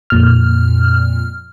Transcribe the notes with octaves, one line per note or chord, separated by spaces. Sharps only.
F2 A#2 F6